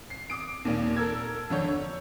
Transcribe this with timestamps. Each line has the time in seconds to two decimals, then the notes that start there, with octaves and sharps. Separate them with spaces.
0.10 C7
0.30 D6 D#6 D7
0.65 D#2 A#2
0.97 A4 A#4 E6 G#6
1.50 F2 D3 C#5 G6
1.68 C#5